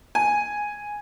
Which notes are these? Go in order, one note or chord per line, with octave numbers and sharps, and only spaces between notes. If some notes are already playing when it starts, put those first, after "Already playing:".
G#5